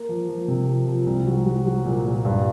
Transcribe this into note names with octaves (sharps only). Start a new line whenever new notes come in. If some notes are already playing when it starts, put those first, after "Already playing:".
Already playing: A#3
F3
F3
C3
F3
F3
C2
F#3
F#3
F#3
A#2
A#2
G2